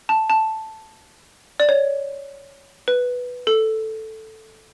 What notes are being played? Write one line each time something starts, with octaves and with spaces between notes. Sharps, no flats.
A5
A5
D5
C#5
B4
A4